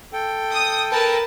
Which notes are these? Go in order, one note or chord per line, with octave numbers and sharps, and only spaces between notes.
A4 G5
D#6
A#4 B4 A5